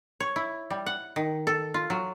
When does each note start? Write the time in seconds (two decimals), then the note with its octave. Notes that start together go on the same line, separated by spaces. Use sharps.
0.20 C#5
0.36 E4
0.70 G3
0.86 F#5
1.16 D#3
1.47 A4
1.74 F4
1.90 F#3